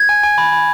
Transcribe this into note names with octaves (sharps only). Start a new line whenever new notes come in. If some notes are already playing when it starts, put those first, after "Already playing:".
Already playing: G#6
G#5
G#5
B5
B5